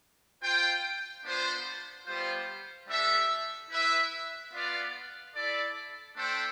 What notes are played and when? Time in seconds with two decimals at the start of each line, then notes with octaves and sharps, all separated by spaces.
0.42 F4 C5 G5
1.24 B3 D4 F4 C5
2.05 G3 B3 F4 C5
2.87 G3 D4 A4 E5
3.69 E4 B4 E5
4.52 B3 F4 B4 D5 F5
5.34 E4 A4 D5
6.15 A3 D4 A4 C5 G5